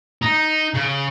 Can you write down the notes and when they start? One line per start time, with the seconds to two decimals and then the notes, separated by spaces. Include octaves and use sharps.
0.22 D#4
0.74 C#3